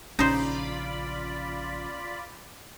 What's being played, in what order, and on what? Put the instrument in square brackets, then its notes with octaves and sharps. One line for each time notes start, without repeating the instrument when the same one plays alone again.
[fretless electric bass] A#1 C#3 [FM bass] C#4 [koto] D#4 C5 [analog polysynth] F4 D5 B5